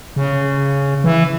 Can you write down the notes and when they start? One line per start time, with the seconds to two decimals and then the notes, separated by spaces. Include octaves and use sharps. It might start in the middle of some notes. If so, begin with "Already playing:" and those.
0.16 C#3
1.04 E3